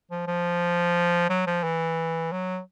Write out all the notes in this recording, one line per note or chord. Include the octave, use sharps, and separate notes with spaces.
F3
F3
F#3
F3
E3
F#3